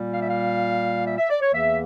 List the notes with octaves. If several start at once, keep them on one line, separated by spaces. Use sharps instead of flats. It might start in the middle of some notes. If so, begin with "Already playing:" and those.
Already playing: A#2 G3 A#3
F5
E5
F5
E5
E5
D5
C#5
E2 E3 A#3 E5